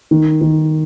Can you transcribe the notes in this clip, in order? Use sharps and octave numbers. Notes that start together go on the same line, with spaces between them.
D#3
D#3